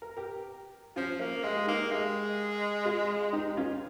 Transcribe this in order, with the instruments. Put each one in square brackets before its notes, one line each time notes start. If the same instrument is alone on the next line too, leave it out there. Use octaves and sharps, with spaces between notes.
[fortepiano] A#4
G4 A#4
[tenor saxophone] F3 [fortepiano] C#4 F4
[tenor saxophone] A#3
[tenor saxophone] G#3 [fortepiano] G4
[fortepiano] G#4
[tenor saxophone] A#3 [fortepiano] D#4 G4
[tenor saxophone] G#3 [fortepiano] G4 A#4
[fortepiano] F4 G#4
D#4 G4
C#4 F4